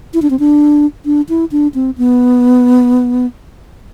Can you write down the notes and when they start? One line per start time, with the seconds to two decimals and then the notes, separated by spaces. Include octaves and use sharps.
0.14 E4
0.22 D4
0.30 C4
0.39 D4
1.05 D4
1.29 E4
1.52 D4
1.74 C4
1.98 B3